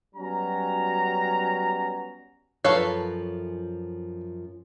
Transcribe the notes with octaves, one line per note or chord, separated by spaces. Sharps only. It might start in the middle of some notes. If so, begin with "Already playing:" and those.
F#3 G3 B3 C#4 F#4 A#5
F#2 F3 A4 B4 C#5 F5